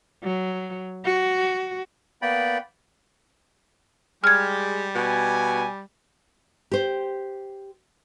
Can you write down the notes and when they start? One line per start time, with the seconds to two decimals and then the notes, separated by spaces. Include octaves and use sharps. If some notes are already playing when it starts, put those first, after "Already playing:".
0.23 F#3
1.05 F#4
2.22 A#3 B3 D5 G5 B5
4.24 G3 G#3 G4 F6 G#6
4.95 B2 G#5
6.71 G4 C5